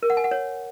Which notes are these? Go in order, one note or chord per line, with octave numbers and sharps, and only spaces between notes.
A#4
F#5
G#5
F#5
C#5